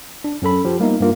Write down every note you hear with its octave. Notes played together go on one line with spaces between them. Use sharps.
D4
F#2 C#4 A4 B5
F3 G4
G3 A#3 B3 D#4 E5
G2 A#3 F4